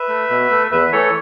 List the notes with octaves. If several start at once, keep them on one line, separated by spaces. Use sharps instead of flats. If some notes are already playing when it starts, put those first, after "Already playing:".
Already playing: B4 E5
A3
B2
A3
E2 B4 E5
E3 A3 A4 C#5